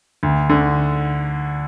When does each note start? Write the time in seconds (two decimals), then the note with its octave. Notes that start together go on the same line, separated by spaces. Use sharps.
0.23 D2
0.50 D3